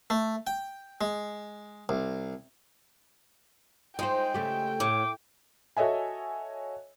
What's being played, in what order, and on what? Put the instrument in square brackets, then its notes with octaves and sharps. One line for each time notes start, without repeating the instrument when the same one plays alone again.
[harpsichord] A3
G5
G#3
C2
[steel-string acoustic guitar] G#3 [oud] D#4 F4 C5 [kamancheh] G5
[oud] C#3 A3 G4
[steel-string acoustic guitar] A2 [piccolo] D6
[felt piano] F#4 A4 C#5 D#5 E5 G#5